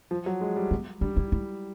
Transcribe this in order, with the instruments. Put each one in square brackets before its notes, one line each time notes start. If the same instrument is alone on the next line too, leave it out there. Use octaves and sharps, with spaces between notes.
[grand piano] F3
F#3
G#3
G3
[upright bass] B3
[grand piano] G3 [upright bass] D4
[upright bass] E4
E4